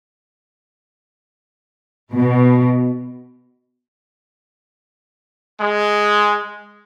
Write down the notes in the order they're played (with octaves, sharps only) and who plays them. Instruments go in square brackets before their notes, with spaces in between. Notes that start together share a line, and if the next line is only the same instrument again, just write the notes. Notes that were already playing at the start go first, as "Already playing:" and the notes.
[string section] B2
[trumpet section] G#3